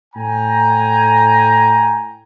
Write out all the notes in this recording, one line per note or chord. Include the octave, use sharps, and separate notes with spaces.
A2 G5 G#5 A#5